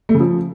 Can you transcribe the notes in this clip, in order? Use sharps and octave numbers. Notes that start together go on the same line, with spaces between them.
A3
C#3
F3